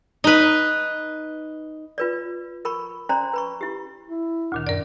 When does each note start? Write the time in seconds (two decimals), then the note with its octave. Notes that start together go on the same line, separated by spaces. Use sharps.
0.24 D#4 B4
1.98 F4 B4 D5
2.65 A#4 B5 C#6
3.09 C#4 C5 D5 A#5 C6
3.33 B4 B5 C#6
3.61 E4 G4
4.07 E4
4.52 D2 A#2 D#3
4.67 F#2 A#4 D5